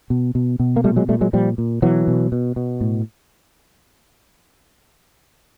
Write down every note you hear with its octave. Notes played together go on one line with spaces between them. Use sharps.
B2
B2
B2
A#3
A#2 G3 A3
F#3 G#3
A#2 G3 A3
F#3 G#3
A#2 F3 G3
A#2
B2 E3 F#3
B2
B2
B2
A2